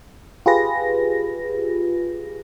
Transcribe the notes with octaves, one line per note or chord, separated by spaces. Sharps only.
F4 G4 G#4 B4 A#6